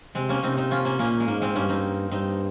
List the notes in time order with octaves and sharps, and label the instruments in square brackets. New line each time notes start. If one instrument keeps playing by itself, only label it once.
[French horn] C3 [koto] G#3 C4
[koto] A#3 C#4
[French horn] C3 [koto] C4 D#4
[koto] C4 D#4
C#4 F4
A#3 C#4
[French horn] A#2 [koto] A#3 C#4
[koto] G#3
[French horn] G#2 [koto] A#3
[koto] G#3 C4
[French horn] G2 [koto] A#3 C#4
[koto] C4 D#4
[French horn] G2 [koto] C4 D#4